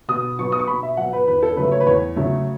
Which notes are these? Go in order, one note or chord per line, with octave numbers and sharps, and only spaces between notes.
B2 D#6
F#3 B3 C#6
D#6
C#6
B2 B5
E5
F#3 B3 F#5
B4
E2 B4
A4
C#3 F#3 A3 B4
C#5
B4
E2 C#5
C#3 F#3 A3